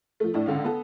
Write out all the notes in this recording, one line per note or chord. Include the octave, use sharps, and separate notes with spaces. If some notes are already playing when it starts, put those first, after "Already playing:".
F3 A3
A2 D4 E4
C#2 D3 C#4 F5
B3 A4